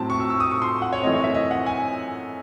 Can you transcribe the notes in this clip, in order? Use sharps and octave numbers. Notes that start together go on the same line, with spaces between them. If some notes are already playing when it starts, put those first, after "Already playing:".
Already playing: A2 F#3 C4 A5
C#6
E6
E6
D#6
C#6
C6
F#5
C#5
F#2 E3 A3 C4 D#5
C#5
E5
D#5
F#5
G#5